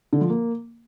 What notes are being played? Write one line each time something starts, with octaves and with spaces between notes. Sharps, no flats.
D3
F3
A#3